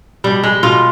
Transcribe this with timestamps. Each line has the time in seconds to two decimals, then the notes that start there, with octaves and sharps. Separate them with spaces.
0.24 B2 G3
0.44 G#3
0.63 B2 F4